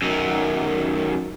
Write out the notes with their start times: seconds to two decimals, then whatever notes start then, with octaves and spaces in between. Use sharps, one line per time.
0.02 F#2 D#3